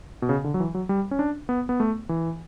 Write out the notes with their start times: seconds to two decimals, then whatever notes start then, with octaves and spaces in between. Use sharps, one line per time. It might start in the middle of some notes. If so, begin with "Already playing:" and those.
0.22 B2
0.29 C#3
0.44 D3
0.54 F#3
0.60 E3
0.75 F#3
0.89 G3
1.11 C#4
1.19 D4
1.49 B3
1.69 B3
1.80 A3
2.09 E3